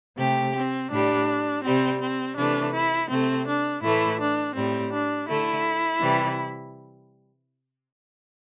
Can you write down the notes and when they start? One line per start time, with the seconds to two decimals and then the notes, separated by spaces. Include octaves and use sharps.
0.17 C3 A3 G4
0.54 C4
0.90 A2 G3 D4
1.63 C3 G3 C4
1.99 C4
2.36 C3 E3 A3 D4
2.73 E4
3.09 C3 A3 C4
3.46 D4
3.82 A2 E3 A3 E4
4.19 D4
4.55 A2 G3 C4
4.92 D4
5.28 D3 A3 E4
6.01 C3 E3 G3